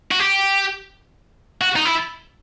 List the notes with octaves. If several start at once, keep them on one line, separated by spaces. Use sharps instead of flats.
F#4
G4
F#4
D#4
E4